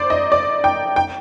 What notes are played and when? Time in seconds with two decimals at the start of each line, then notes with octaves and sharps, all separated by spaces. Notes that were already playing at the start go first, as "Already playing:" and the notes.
Already playing: C5 D5
0.10 D#5
0.32 D5
0.64 G5
0.96 G5